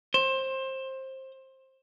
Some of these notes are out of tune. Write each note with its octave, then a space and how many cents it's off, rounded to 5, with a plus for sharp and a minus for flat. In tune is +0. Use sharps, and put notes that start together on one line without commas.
C5 +20